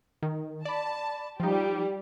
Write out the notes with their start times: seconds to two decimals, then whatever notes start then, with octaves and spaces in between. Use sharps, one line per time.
0.23 D#3
0.65 D5 A5 B5
1.40 F3 G3 D#4 G4